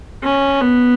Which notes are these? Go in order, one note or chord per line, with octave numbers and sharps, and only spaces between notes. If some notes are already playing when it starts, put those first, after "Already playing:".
C#4
B3